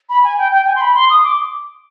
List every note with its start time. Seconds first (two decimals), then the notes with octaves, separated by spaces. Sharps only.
0.09 B5
0.24 G#5
0.38 G5
0.52 G5
0.67 G#5
0.75 C6
0.81 B5
0.95 C6
1.10 D#6
1.24 D6